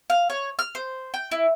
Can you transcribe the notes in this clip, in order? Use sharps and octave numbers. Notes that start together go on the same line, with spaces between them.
F5
C#5
F6
C5
G5
E4